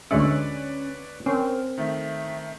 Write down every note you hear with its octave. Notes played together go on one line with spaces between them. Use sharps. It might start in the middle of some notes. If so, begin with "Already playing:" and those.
D2 G#3 C#4 B4 C#5 D5 E5
C4 C#4 A#4
D#3 A3 E5